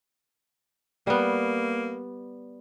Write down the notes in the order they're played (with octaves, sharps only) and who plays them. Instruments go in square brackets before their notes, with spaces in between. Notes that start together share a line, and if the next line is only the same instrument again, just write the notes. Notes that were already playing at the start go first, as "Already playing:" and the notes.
[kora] G3 B3 [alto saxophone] A#3